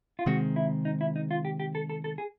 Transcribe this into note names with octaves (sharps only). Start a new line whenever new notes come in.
F4
C3 D#3 G#3 C4 F#4
E4
D#4
E4
D#4
F4
G4
G4
A4
A4
A4
G#4